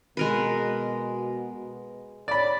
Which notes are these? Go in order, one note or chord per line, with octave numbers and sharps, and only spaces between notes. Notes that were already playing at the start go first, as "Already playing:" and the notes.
B2 G#3 B3 A#4 B4
C#5 D5 B5